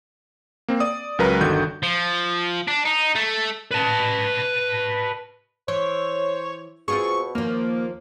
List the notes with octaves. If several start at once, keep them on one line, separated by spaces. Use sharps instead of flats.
A#3 C4
D5 D#6
C#2 F#3 A#4 B4 A#5
G1 D3 D#3 F#4 G6
F3
D4
D#4
A3
B4 A5
E3 C5 C#5
B2 C4 F4 G#4 C#6
D#2 F3 A#3